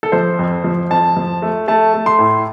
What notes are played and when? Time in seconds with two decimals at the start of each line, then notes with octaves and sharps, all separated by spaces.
0.03 A4
0.12 F3 C5
0.39 F2
0.64 F3
0.91 F2 A5
1.17 F3
1.42 A3
1.68 A3 A5
1.94 A3
2.06 C6
2.19 A2